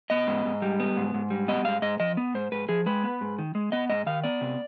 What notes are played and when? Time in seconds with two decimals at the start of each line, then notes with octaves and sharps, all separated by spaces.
0.10 B3 D#5
0.27 G#2
0.45 G#2
0.62 G3
0.80 B3
0.97 G#2
1.14 G#2
1.30 G3
1.48 B3 D#5
1.65 G#2 F5
1.82 G#2 D#5
2.00 F3 D#5
2.17 B3
2.34 G#2 C5
2.52 G#2 B4
2.69 F3 G#4
2.86 G#3 B4
3.03 B3
3.21 G#2
3.39 D#3
3.55 G#3
3.72 B3 D#5
3.89 G#2 D#5
4.06 D#3 F5
4.24 B3 D5
4.41 C3